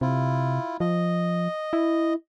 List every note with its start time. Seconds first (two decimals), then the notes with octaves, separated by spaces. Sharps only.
0.01 C3 E4 F4
0.80 F3 D#5
1.73 E4